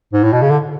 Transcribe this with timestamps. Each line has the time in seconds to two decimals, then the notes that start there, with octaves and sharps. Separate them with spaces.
0.13 G#2
0.23 A2
0.33 B2
0.42 C#3
0.50 D3